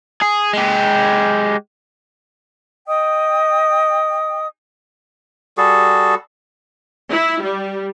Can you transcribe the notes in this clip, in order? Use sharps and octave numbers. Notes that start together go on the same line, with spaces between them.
G#4
G#3 G4
D#5 G5 D#6
G3 F#4 G#4 A4
E4
G3